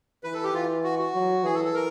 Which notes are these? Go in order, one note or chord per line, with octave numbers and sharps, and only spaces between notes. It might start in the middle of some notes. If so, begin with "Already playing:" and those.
E3 B4
A4
G4
E3 F4
F#4
F#4
F#3
E3 G#4
A4
A4
A#4